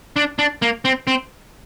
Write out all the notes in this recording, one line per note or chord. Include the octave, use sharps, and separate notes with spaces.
D4
D4
A#3
C4
C4